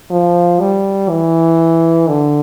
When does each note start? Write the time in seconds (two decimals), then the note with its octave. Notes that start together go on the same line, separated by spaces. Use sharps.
0.11 F3
0.60 G3
1.09 E3
2.08 D3